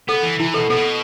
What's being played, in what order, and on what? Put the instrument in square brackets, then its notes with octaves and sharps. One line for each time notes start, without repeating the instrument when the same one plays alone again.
[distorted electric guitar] B3 [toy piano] A4
[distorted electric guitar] E3
[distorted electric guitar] E3 [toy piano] E4
[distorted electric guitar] B2 [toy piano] A4
[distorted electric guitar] B2 [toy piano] A4